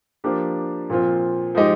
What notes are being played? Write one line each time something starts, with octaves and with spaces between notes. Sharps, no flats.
F3 A#3 D4 G4
A#2 F3 C4 F4
F3 G#3 D#4 G4